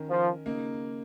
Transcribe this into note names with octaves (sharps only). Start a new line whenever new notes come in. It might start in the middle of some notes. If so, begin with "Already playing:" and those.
Already playing: D#3 C#4 A#4
F3
C#3 A#3 D#4